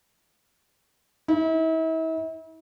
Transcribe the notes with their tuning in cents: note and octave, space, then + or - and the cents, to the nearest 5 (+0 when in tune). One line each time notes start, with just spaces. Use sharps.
E4 -40